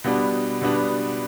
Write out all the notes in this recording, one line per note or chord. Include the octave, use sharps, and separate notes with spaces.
B2 G3 B3 D4
B2 G3 B3 D4